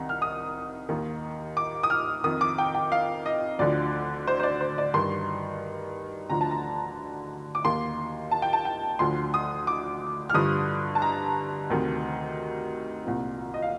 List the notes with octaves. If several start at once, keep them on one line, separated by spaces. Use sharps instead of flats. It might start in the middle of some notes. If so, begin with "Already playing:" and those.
Already playing: C2 C3 D#3
F6
D#6
D#2 D#3
D6
D#6
F6
F2 D#3 D#6
D6
G5
G5
F5
D#5
D2 D3 F3 D5
C5
C5
D5
C5
D5
G2 D#3 C6
D2 D3 F3 A#5
A5
A#5
D6
D#2 D#3 C6
A5
G5
A5
G5
D2 D3 F3 C6
D#6
D6
F6
G2 D3 F3 D#6
A5
A#5
D2 C3 D#3
C2 A#2 F3
D#5
F5